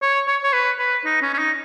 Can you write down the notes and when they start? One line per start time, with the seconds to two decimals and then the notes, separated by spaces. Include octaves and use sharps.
0.02 C#5
0.28 C#5
0.44 C#5
0.53 B4
0.79 B4
1.05 D#4
1.22 C#4
1.34 C#4
1.39 D#4